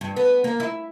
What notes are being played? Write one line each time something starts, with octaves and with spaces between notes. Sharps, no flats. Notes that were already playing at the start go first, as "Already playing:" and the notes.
G2
B3
A#3
E4